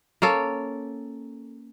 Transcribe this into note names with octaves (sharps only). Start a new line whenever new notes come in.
A#3 C#4 A4